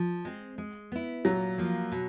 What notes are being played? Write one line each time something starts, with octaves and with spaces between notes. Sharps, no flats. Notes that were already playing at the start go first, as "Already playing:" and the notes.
Already playing: F3
G#3 C4
G#3
B3 E4
A#2 F#3
F3 A#3
B2